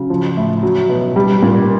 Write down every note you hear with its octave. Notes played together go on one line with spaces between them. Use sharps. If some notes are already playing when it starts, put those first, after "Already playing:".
Already playing: C#3 F#3
F3
A2
F#3
B2
G3
A#2